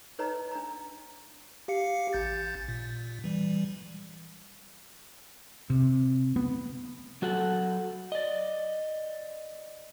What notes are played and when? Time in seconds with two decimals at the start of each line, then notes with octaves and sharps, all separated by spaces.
0.19 D#4 B4 C#5 D#5 A#5
0.51 D4 A#5
1.68 G4 F5 C#7
2.13 A1 G6 A6
2.69 A#2
3.24 E3 G3
5.70 C3
6.36 B3
7.22 F#3 F#4 A4 F#5
8.12 D5 D#5